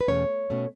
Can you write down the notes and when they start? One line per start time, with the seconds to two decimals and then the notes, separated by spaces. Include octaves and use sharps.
0.01 B4
0.08 E2 B2 A3 C#4 C#5
0.50 B2 A3 C#4